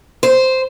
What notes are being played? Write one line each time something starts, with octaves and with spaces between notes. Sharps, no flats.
C5